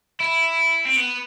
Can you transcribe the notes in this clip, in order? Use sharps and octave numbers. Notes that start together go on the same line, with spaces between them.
E4
C4
B3